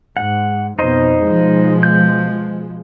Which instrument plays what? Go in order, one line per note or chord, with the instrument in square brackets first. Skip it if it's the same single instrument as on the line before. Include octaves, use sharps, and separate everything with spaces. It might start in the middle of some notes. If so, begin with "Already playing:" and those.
[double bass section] G#2 [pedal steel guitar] F#5
[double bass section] F2 B2 [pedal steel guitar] D#4 C5 D#5
[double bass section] B2 F3 G#3
[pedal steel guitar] G6